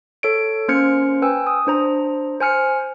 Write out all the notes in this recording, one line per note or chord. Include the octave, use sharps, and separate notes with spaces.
A4 C#5 D7
A#3 C#4 C5 F6 G#6 C#7
B4 G5 G#5 E6
D#6
D4 C5 A#5
C5 G#5 F6 C#7